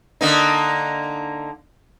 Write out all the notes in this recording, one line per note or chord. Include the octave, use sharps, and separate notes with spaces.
D3 A#3 D#4